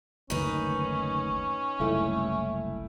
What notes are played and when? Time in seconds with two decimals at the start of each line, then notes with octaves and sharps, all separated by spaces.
0.30 F#1 D2 D#3 C#4 D#4 B4
1.80 F#1 C2 A3 E4